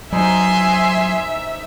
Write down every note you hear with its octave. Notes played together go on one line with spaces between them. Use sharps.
F#3 D#4 C5 E5 G#5 A#5 C6